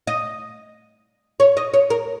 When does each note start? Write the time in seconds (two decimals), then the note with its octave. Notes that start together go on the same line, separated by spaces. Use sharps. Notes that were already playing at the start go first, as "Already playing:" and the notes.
0.07 D#5
1.40 C#5
1.57 D#5
1.74 C#5
1.90 A#4